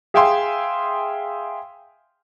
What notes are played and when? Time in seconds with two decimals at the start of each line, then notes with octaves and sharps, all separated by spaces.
0.14 G#4 E5 F5 G5 G#5 C6